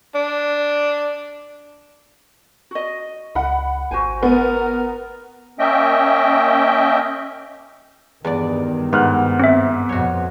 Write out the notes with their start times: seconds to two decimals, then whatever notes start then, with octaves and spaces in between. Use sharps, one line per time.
0.15 D4
2.71 F#4 D#5
3.35 C#2 F#5 B5
3.91 G#1 F#4 C5 G#5
4.23 B3 A#4
5.59 A#3 C#4 D#5 E5 G5
8.25 E2 G2 D#3 D5
8.93 G#2 B3 F6 F#6
9.40 C4 E5
9.89 F2 B2 F#4 C#5